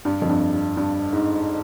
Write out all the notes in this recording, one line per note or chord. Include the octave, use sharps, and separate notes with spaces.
G2
F2
G2
G2
G2
G#2